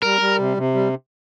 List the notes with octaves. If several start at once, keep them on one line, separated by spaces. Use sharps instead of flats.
G3 A#4
G3
C3
C3
G3